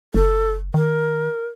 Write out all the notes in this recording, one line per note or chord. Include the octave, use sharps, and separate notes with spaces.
F#1 A4
D#3 A#4